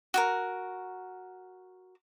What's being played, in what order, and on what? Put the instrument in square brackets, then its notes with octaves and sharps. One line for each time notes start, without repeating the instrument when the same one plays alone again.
[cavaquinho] F#4 G4 A#4